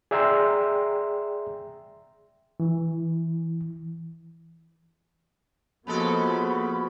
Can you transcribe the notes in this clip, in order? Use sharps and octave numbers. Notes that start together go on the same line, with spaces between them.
G#4 D5 E5 G5 A#5 C6
E3
C#3 F3 G#3 A#3 B3 F#4 A4 B5